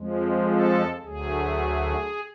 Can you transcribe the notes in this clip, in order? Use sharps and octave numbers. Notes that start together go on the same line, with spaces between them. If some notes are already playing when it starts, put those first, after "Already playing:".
Already playing: F2 F3 G#3
A4
D2 D3 F#3 A3 G#4